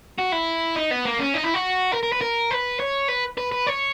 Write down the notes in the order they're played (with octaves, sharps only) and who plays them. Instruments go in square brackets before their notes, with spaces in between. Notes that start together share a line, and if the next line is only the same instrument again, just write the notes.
[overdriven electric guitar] F#4
E4
D#4
B3
A#3
C#4
D#4
E4
F#4
A#4
A#4
B4
A#4
B4
C#5
B4
B4
B4
C#5